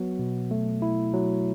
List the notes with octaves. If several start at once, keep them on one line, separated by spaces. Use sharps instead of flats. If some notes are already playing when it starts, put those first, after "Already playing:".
Already playing: F#3 B3 F#4
B2
A3
E4
F#3